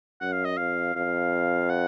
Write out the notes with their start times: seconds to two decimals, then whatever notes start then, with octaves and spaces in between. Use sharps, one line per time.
0.21 F#2 F#5
0.33 F5
0.45 D#5
0.58 F2 F5
0.95 F2 F5
1.70 F#5